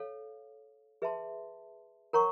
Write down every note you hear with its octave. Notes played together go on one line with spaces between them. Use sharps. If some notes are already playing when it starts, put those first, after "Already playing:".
Already playing: A4 C#5 F5
G#4 B4 E5 A5 C6
A#4 C#5 F#5 A#5 C#6